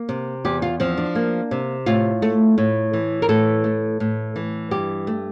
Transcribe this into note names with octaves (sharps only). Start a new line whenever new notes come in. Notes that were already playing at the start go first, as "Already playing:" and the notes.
Already playing: A#3
C3
E2 G4
F4
F3 C4
D4
A#3
C3
A2 F4
A3
A2
E3
A#4
A2 A4
A3
A2
E3
G2 G4
A3